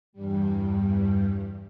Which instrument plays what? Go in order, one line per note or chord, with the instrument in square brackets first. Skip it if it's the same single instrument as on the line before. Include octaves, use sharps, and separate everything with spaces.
[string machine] E2 G2 G3